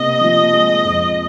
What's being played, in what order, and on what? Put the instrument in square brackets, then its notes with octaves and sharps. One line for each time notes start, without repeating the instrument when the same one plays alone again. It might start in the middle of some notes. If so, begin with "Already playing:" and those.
Already playing: [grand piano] C3 A#3 [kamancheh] D#5
[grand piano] F3
G#3
F2